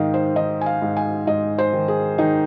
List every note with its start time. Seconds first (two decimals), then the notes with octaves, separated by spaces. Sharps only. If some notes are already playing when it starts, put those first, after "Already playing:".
Already playing: G#2 D#3 D#5 F5
0.14 C5
0.36 D#3 D#5
0.61 G#5
0.66 F5
0.82 G#2
0.97 G#5
1.27 G#2 D#5
1.58 C5
1.73 D#3
1.88 G#4
2.18 D#3 D#4